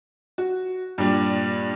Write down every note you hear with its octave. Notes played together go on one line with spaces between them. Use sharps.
F#4
G2 A#2 G3